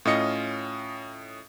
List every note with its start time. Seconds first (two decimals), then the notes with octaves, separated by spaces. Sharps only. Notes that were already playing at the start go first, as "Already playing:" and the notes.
0.05 A2 C#4 F4 D#5 C#7